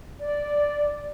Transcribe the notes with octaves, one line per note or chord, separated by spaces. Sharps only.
D5